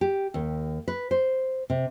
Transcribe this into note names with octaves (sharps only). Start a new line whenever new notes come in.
G4
D#2
B4
C5
C3